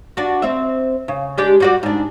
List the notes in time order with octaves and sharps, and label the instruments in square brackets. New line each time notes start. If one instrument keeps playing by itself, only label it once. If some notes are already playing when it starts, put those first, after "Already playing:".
[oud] D4 F#4
C4 E5
C#3
G#3 D4 G4
G3 F#4 D5
G#2 D4